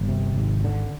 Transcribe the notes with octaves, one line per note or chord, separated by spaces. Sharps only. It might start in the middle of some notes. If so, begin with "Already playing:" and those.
Already playing: G1 D#3
C3
G#1
D3